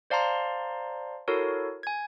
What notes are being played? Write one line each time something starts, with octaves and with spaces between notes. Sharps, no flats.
C5 D5 F5 A5 A#5 C6
E4 F#4 A4 A#4 C#5
G#5 G#6